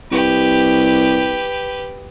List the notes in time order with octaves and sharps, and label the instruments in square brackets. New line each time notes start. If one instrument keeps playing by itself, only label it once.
[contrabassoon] C2 [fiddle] G4 B4